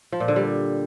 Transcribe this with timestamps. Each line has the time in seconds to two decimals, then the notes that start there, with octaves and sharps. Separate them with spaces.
0.12 F3
0.20 A#2
0.28 D3
0.36 G3